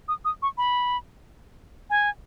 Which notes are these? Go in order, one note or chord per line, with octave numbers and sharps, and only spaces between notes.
D#6
D#6
C#6
B5
G#5